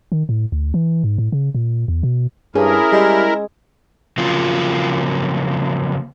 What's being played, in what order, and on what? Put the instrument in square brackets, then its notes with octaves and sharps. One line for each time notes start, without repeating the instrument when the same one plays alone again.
[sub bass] D#3
A2
D2
E3
G#2
A2
C#3
A#2
E2
B2
[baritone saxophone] G2 [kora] C#4 [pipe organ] E4 A#4 [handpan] G#4
[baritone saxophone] G3 [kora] G#3
[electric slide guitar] C#3 F3 F#3 A#3 C4 F4